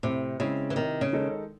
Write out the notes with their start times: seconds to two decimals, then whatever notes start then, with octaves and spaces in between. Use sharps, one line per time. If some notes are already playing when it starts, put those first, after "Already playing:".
0.03 A2 C3
0.40 C#3 G#3 C4 E4
0.70 E3
0.76 C3 D#3
1.01 C#3
1.13 D#3 G#3 D#4 A4